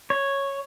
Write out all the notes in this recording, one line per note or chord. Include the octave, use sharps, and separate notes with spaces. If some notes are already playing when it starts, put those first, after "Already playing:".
C#5